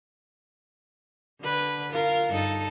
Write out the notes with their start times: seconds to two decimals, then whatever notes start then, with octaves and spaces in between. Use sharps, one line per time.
1.40 D3 B4
1.92 F4 A#4
2.31 G2 D#4 A4